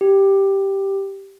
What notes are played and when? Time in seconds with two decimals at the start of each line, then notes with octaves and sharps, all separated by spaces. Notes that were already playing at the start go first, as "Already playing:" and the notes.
0.01 G4